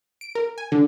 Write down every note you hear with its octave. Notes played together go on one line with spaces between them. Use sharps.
D7
A#4
G#5
D3